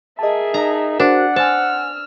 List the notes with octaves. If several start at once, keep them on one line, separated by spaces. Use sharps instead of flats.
G#4 A#4 D#5 E5 A5
D#4 A#5
D4 F#4 A#4 C5 F#5
C5 G#5 A5 E6 F6